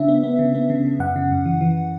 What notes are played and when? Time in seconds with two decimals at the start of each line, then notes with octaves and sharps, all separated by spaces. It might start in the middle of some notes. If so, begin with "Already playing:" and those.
Already playing: C#3 D4 E5
0.08 B3
0.24 B3
0.39 C#3
0.54 B3
0.70 C#3
0.85 C#3
0.99 F#2 F#5
1.16 C#3
1.31 F#2
1.45 E3
1.61 E3